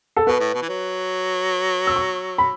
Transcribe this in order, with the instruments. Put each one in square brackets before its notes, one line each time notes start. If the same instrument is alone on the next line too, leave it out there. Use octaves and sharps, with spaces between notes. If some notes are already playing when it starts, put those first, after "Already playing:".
[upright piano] A4
[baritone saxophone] B2 [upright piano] B4
[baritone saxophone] A2
B2
E3
F#3
[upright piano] E6
C#6
B5